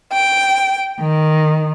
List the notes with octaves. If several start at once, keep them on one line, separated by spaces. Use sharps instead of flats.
G5
D#3